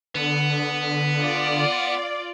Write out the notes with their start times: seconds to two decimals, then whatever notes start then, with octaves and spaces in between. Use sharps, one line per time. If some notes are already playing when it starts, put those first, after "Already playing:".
0.15 D3 B3
1.22 F4 D5